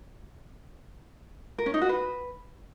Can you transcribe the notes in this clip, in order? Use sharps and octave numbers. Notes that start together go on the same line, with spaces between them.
A#4
C#4
D#4
F#4
B4